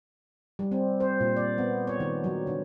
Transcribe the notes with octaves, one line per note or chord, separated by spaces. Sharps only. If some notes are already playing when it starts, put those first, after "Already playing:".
G3
C4
C5
A#2
D5
B3
C#5
D#3
F#3
D3